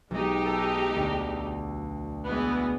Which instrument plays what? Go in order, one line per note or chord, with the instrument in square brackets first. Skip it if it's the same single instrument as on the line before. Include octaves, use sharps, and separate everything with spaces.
[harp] B1 D#5 [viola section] G#3 D#4 G4
[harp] A4 E6
D2
[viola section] E3 G#3 B3